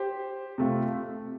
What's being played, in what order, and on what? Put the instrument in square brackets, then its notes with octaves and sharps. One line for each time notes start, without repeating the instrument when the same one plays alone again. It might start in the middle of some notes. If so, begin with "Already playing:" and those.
Already playing: [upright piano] G4 C5
[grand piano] C3 A3 F4